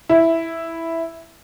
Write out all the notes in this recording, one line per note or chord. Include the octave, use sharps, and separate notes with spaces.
E4